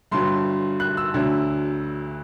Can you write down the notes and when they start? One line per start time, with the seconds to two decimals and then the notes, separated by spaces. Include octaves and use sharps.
0.11 G1 G2 D3 F#3 C6
0.80 F#6
0.97 E6
1.14 D2 D3 F#3